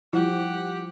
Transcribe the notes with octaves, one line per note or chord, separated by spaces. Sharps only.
F3 G3 E4 G4 F#5